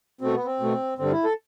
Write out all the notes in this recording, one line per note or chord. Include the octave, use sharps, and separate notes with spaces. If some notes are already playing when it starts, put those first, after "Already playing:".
B2 A3 C4
B3
C4
B2 A3
G2 D3 G3 C4
E4
A4